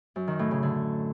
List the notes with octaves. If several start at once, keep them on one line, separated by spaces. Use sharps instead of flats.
F#2
D#3
A2
C#3
D3